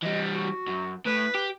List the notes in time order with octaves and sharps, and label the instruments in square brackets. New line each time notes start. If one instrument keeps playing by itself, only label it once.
[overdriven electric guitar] E3 G3 [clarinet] D#5
[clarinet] F#4
[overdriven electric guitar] F#2
[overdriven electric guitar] A2 [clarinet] B4
[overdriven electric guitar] G4